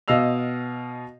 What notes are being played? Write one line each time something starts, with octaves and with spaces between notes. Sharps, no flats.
B2 D#5 F5 E6 F7